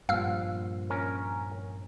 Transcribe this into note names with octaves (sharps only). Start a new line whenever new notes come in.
G2 A#2 F3 F5 E6 F6
C#4 A#4